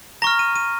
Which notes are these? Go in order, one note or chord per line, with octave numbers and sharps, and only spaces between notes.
A#5 C#6 F6 A#6
D#7
D#7